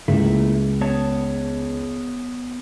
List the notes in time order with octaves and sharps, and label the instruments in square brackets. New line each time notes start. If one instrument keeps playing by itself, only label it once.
[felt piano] C#2 [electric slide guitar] A3 A#3 E4
[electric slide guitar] B3 C#5 A5